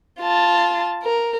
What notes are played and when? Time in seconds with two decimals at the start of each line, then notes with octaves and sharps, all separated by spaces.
0.20 F4 A5
1.03 A#4